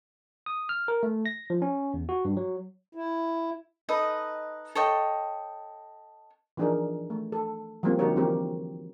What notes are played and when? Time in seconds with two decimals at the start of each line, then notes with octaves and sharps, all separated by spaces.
0.46 D#6
0.69 F6
0.88 A#4
1.03 A3
1.26 A#6
1.50 F3
1.62 C#4
1.94 E2
2.09 F#4
2.25 G2
2.37 F#3
2.95 E4
3.89 D#4 A4 B4 D#5
4.75 A4 C#5 D#5 G5
6.57 E3 F3 D4 D#4 G#4 A#4
7.10 A3
7.32 A4
7.83 F3 G3 G#3 A#3 C4 E4
7.99 D3 D#4 F#4 G4 A#4 C#5
8.16 E3 F3 G#3 C4 G4 A#4